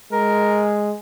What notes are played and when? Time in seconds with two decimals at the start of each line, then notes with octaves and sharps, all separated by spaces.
0.12 G#3 A#4